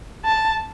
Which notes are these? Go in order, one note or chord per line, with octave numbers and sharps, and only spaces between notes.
A5